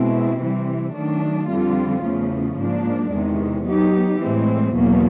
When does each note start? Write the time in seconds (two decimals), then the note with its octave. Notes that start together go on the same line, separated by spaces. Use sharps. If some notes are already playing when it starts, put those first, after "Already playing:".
Already playing: B2 G#3 C4 E4
0.40 C3 E3 G3 C4
0.95 D#3 F#3 A3 D4
1.49 F2 D3 G3 C4 F4
2.03 E2 C#3 F3 A3
2.57 G#2 F3 A#3 D4
3.12 E2 C3 D#3 G#3
3.66 F#3 B3 D#4 G4
4.21 A2 E3 G#3 C4
4.74 E2 B2 F#3 A#3